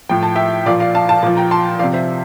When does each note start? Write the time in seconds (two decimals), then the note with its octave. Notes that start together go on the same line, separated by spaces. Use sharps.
0.09 A2 F3 G5
0.23 A5
0.35 E5 G5
0.66 A#2 F3 D5 F5
0.80 D5 F5
0.95 F5 A5
1.08 F5 A5
1.23 A#2 F3
1.37 G5 A#5
1.51 A5 C6
1.79 C3 F3 D5 F5
1.93 C5 E5